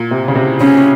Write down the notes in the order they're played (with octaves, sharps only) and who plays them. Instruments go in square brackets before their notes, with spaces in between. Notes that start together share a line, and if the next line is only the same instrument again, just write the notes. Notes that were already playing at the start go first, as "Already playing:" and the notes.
Already playing: [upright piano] A#2
C3
C#3
C3
[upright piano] C#3 [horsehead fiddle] C#4